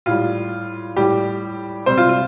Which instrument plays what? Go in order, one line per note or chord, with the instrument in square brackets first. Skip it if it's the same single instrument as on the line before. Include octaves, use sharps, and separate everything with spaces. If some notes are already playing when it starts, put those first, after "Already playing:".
[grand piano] A2 G3 F4
A2 G3 G4
C3 G3 C5
F4
F4